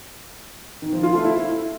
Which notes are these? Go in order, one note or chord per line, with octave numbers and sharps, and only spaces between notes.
D#3
F3
F4
A3
E4